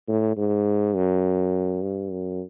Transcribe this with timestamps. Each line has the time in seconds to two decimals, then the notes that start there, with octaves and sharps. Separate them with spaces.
0.08 A2
0.37 G#2
0.95 F#2
1.82 G2
2.11 F#2